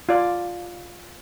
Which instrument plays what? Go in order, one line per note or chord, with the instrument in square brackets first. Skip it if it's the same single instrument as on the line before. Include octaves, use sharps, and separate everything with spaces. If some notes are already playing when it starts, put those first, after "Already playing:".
[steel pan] F4 D5